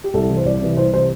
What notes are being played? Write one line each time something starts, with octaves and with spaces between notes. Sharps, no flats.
G4
C2 A4
C3 E3
C5
C2 D5
C3 E3
C2 C5
C3 E3 C5